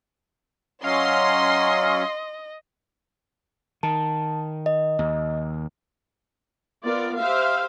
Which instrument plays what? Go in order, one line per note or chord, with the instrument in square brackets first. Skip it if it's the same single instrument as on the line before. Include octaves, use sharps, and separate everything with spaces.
[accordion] F#3 C#4 [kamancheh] D#5 [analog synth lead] F5 [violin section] C6
[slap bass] D#3 [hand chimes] A5
[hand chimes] D#5
[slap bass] D#2
[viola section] B3 F4 A#4 D5
G4 C5 E5 F5